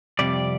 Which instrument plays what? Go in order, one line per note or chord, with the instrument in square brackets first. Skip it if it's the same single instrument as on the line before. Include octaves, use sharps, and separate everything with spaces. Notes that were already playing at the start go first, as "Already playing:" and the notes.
[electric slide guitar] F2 C3 G3 D5